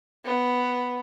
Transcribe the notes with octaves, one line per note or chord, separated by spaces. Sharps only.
B3